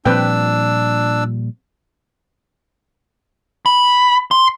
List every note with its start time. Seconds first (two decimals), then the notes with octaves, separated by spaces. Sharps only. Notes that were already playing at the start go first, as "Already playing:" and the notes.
0.05 A#2 F3 G3 C4 D4 B4 G5 E6
3.66 B5
4.31 C6